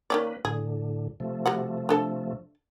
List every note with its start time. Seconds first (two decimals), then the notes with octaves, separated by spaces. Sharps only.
0.10 D#3 A#3 C#4 B4 D5
0.45 A2 D3 G#4
1.20 C3 F3 A3
1.46 G3 F#4 F#5
1.89 D4 A4 A5